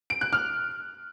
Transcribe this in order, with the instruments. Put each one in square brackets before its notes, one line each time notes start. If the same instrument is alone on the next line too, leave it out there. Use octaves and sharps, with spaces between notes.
[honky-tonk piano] D7
F#6
F6